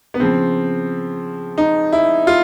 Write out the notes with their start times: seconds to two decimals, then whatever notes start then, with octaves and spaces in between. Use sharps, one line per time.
0.14 B3
0.20 C#3 F3 C4
1.58 D#4
1.92 E4
2.27 F4